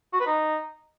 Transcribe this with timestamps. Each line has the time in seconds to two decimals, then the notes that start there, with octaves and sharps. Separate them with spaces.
0.13 F#4
0.20 B4
0.27 D#4